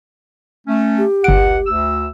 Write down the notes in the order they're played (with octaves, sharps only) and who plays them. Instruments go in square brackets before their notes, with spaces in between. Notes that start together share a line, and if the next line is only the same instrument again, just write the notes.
[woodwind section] A3 C#4
[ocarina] G4
[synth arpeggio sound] G1 D7 [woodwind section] C#2 F#5
[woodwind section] D2 E6